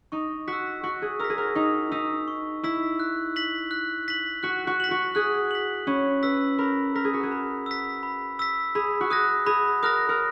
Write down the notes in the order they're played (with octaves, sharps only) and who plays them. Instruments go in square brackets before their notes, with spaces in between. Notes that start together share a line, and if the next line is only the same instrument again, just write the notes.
[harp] D#4 [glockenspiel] C#6
[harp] F#4 [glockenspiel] B6
[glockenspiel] E6
[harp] F#4 [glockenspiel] C#6
[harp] G#4
[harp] A#4 [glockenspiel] E6 B6
[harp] G#4
A#4
[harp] D#4 [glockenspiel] C#6
[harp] D#4 [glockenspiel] E6 B6
[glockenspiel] C#6
[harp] E4 [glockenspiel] E6 B6
[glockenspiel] F#6
B6 F#7
F#6
B6 F#7
[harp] F#4 [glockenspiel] F#6
[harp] F#4
[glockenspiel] B6 F#7
[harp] F#4
[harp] G#4 [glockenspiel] F#6
[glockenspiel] B6 F#7
[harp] C#4 [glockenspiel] B5
[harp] B4 [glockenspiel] E6 B6
[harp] A#4 [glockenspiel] B5
[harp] A#4 [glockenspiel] E6 B6
[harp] G#4
F#4
G#4
[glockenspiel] B5
E6 B6
B5
E6 B6
[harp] G#4 [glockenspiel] B5
[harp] F#4
[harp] G#4 [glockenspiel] D#6 F#6 A#6
[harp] G#4 [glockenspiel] B5
[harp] A#4 [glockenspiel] D#6 F#6 A#6
[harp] A#4